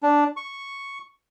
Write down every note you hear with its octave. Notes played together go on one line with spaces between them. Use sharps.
D4
C#6